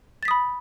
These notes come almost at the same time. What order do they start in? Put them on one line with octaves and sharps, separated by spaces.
A6 B6 D#6 B5